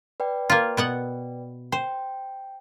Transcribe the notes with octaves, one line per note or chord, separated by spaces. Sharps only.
B4 D5 G5
A#3 F4
B2 B3 F#5
C5 G5